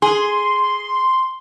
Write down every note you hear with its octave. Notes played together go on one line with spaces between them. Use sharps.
G#4 C6